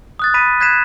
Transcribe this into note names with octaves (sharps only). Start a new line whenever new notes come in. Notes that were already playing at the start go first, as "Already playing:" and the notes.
D#6 F#6 A6
B5 B6 D#7
F#6 G#6 B6 C7 E7